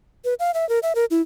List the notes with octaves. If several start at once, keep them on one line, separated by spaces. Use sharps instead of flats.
B4
F5
E5
A#4
E5
A#4
E4